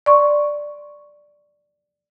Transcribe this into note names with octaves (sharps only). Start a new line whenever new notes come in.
D5 C6 C#6